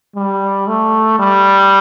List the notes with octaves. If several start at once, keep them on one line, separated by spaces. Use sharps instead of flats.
G3
A3
G3